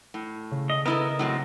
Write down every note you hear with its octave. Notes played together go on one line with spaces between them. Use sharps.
A2
C#3
D#5
B3 E4 A4 A#4 D#5
A2 F#3 C4